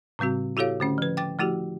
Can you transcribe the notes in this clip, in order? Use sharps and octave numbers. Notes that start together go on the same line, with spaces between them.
A2 C#3 G3 C4 F#4
E4 F#4 G4 A4 C#5 F5
D3 A3 C#4
F3 B4
G5 D6 A6
F3 A3 E4 F#4 G4